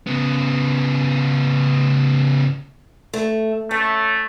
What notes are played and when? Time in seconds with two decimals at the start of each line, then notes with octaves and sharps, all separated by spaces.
0.07 C#3 B3
3.13 A3
3.71 A3 C#4